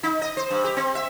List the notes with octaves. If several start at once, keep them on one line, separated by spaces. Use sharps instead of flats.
D#4
D#5
C5
G2
G4
C4
E5